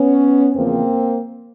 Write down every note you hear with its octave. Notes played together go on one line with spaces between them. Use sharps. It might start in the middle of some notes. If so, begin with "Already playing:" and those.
Already playing: B3 C#4
E2 C#3 F3 A#3 C4